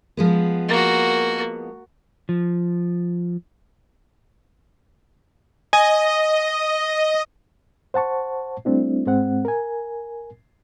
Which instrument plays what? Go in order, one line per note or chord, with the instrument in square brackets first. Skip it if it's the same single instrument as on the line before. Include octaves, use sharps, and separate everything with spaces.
[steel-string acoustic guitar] F3 G#3 B3
[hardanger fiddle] A#3 F#4
[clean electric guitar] F3
[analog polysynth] D#5 [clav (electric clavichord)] G#5
[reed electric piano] C5 F#5 A5 C#6
G3 A3 C4 D4 E4
G#2 G#3 C4 F#5
A#4 G#5